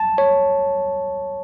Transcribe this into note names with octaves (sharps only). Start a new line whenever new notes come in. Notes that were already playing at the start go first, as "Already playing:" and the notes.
Already playing: A5
C#5